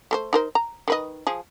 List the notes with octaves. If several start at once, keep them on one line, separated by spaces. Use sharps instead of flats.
A3 A4 C5
D#4 A#4 C5
A#5
D#3 B4 D#5
F3 G#4